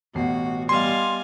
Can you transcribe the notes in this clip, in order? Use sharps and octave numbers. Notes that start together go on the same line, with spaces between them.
A1 B2 F#4 C7
G3 B3 D#5 F5 G#5 C6